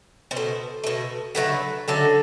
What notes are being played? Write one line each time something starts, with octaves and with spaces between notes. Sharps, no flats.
B2 C5
A3
B2 A3
D3 F#3 A3 B4
D3 F#3 A3 A4